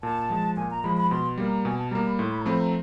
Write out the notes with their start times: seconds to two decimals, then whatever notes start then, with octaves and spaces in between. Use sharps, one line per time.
0.03 A#2 A5
0.30 F3 G#3
0.56 A#2 G#5
0.71 A#5
0.83 F3 G#3 B5
0.97 B5
1.11 B2 C6
1.38 G3 A#3
1.47 A#5
1.65 B2 G#5
1.78 A5
1.91 G3 A#3 A#5
2.05 B5
2.18 A2 C6
2.32 B5
2.40 A#5
2.46 F3 A3 C4 B5
2.59 A#5